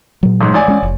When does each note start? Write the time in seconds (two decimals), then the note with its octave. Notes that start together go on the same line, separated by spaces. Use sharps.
0.23 A#2 F#3
0.41 A1 G#2
0.54 A1 D5 G#5
0.68 G#3 C#4
0.82 F1